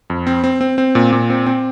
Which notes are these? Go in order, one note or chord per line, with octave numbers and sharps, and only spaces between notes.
F2
C4
C4
C4
C4
A#2
A#2
C4
C4